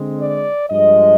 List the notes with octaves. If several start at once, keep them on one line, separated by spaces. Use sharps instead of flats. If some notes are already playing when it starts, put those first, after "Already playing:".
Already playing: D3 G#3 C4
D5
G2 F3 G#3 D#5